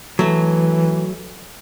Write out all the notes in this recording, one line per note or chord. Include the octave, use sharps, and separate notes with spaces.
E3 F#3 A3